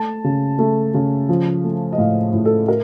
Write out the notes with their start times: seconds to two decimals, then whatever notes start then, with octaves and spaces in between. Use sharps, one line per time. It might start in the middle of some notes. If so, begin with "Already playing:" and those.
Already playing: A3 A5
0.24 C#3
0.59 A3
0.94 C#3
1.29 F3
1.64 A3
1.93 D#5
1.98 A2 F5
2.33 A2
2.45 A4
2.68 A#4